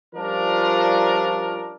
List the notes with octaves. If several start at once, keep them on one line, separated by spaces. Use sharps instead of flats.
F3 G3 C#4 D4 F4 A#4